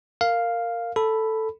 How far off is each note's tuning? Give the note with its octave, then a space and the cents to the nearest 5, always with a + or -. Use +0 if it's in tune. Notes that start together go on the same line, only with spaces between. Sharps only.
A#4 -15 F5 +0
A4 +5 B5 +0